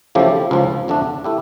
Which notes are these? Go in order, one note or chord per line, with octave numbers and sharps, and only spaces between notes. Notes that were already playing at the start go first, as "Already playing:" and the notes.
C#3 F3 A3 E4 G4
C#2 C#3 F3
F2 D3 A3 D4
A3 E4 G4